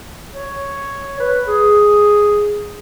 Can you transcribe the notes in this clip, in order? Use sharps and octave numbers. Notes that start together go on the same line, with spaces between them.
C#5
B4
G#4